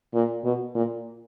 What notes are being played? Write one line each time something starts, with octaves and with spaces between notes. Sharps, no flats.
A#2
B2
A#2